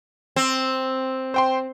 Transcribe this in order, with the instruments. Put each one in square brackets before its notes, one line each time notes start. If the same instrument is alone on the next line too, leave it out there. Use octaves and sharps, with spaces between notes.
[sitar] C4
[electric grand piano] C5 G5 C6